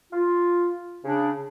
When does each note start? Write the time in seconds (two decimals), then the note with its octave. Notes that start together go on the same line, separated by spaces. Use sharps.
0.12 F4
1.05 C#3 D4